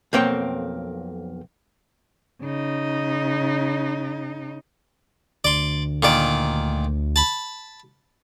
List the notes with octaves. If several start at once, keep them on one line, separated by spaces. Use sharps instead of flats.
B1 F2 A#3 C4 C#5 G5
C#3 D#4
D2 D5 C6
A#2 D#3 D5
A5 B5